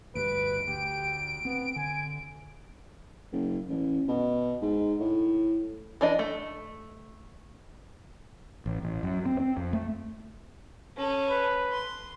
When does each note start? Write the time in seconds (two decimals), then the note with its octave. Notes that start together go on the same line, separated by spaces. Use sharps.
0.15 D2 G2 G3 B4 D7
0.68 D2 G4
1.45 B3 C4
1.76 D3 G#5
3.32 F#1
3.69 A1
4.08 B2
4.62 G#2
5.00 A2
6.01 E3 D4 D#5
6.19 A3
8.66 A1
8.83 A1
9.03 F#2
9.26 C4
9.40 C4
9.57 F2
9.73 A3
10.97 C#4 A4
11.29 B4
11.72 C6